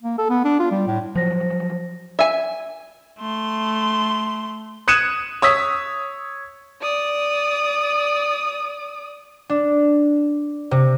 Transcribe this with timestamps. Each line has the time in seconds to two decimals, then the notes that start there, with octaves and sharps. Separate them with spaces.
0.03 A#3
0.18 A4
0.30 B3
0.44 D4
0.59 F4
0.71 G3
0.87 A2
1.16 F3 F#3 C5 A#6
2.19 E5 G#5
3.19 A3 C6
4.88 D#6 F#6 G#6 C#7 D#7 E7
5.42 C#5 D#6 E6 B6
6.82 D5 D#6
9.49 D4
10.71 C3